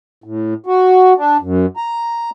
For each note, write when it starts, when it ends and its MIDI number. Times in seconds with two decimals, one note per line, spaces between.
0.24 0.54 45
0.66 1.13 66
1.18 1.37 62
1.41 1.66 42
1.77 2.30 82